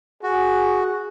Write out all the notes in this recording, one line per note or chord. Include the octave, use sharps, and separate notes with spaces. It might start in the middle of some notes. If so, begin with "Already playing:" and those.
F#4 G#4